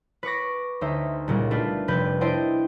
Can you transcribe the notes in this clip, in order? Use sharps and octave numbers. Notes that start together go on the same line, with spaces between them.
B4 C#6 D6 A#6
D2 D#4 C5 E5
C#2 A#2 G3
A3 D4 F4 A4 B4
F1 C3 C4 B4 G6
D4 E4 C5 D5 D#5 G5